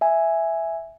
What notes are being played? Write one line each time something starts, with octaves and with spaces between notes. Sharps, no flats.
E5 G#5